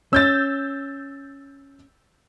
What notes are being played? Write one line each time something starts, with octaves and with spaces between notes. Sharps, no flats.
C#4 E6 G6 A6